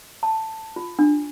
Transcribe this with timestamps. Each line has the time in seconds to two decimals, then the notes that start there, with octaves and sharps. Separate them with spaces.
0.23 A5
0.76 F4
0.99 D4